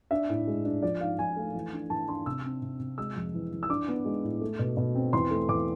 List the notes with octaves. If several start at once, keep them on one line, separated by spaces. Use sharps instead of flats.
D4 E5
A2
G#3
D4
F3 D5
G#2 F5
F3 G#5
A3
E3
D4
E3 A5
D4 C6
C3 E6
C4
C3
C3
G#3 E6
F2
E3
E3
E6
D4 D6
B3
G#3
A2
A3
B2
B2
C4
E2 C6
A3
E2 D6